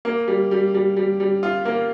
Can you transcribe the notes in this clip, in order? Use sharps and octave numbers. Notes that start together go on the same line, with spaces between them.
A#3
G3
G3
G3
G3
G3
F4
A#3